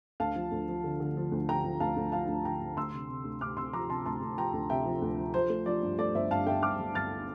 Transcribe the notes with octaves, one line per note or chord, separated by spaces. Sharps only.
D2 F5 A5
F3
D2
F3
D3
D3
F3
D2
D3 G5 A#5
F3
D2 F5 A5
D2
F3 F5 A5
D2
D3 G5 A#5
D2
D2 C6 E6
C3
C3
D2
D2 D6 F6
C3 C6 E6
F3 A#5 D6
C3 A5 C6
D2 A5 C6
D2
F3 G5 A#5
D2
C3 E5 G5
F3
D2
F3
F3 C5
A3
F3 D5
G2
A3 D5
G1 C5 E5
G2 F5 A5
A3 E5 G5
G2 D6 F6
G1
G1 F6 A6